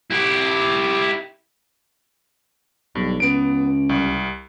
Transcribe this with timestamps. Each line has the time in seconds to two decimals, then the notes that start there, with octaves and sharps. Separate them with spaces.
0.11 E4 G4
2.95 B1 G2
3.20 C#2 B3 D7
3.89 C2